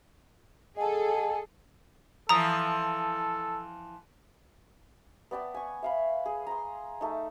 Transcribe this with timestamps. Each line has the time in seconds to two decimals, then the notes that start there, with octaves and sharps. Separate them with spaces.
0.77 G#4 A4 D#5 F#5 G#5 A5
2.29 E3 F3 A4 A#5 D#6
5.31 B3 D5 G5 A5
5.54 G#5 C#6
5.83 E5 F5 B5
6.26 G#4
6.47 A#5 C6
7.01 A3 D#4